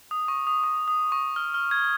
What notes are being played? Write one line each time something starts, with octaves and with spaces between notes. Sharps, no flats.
D#6
C#6
D#6
C#6
D#6
C#6
F6
F6
G#6